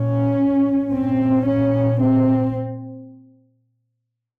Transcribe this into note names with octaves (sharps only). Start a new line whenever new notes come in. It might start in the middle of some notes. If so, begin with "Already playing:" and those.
Already playing: A#2 C#4
A#2
C4
A#2 C#4
C4